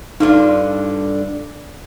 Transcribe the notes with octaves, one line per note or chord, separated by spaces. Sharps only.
G2 D3 D#4 F4